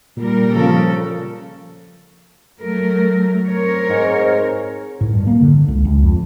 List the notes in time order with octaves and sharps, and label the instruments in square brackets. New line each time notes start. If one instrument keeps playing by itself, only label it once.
[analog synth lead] A#2 [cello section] G3 A#4
[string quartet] C#3 A4 [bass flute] F3
[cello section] F#3 A3 A#4
C4 A#4 C#5
[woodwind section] G#2
[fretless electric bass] A2
G2
A#3
D3
C#2
C#2
F2